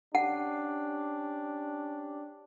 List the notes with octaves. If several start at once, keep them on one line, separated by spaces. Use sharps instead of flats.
C#4 D4 G4 F#5